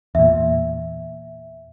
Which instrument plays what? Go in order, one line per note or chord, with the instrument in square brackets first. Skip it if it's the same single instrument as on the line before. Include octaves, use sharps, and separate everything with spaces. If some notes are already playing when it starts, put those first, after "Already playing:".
[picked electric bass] E2 A#2 [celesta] E5